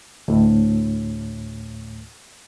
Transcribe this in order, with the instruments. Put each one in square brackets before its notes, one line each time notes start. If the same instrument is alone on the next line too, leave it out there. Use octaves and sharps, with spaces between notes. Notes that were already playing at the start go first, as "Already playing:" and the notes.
[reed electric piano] D2 A2